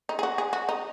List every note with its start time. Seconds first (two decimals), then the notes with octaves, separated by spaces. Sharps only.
0.09 D#4
0.19 G#4
0.23 F#4
0.38 G#4
0.53 F#4
0.69 D#4